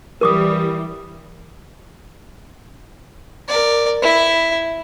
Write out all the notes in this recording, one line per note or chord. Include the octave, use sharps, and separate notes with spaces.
E3 G3 A#4 D6 D#6
A#4 D5
E4 E5